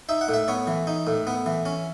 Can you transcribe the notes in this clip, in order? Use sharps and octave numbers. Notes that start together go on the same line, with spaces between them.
D#4 E5
F#5
A2
E5
B3 C#5
E3
D#4
A2
B3
E3
C#4